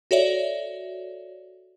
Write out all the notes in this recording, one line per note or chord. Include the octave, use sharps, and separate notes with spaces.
F#4 A4 C#5 D5 E5